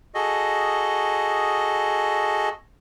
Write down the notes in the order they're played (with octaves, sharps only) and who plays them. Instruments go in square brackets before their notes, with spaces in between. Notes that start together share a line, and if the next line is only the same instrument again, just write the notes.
[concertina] F#4 G#4 A4 D#5